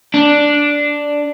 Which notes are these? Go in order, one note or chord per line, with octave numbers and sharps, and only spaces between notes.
D4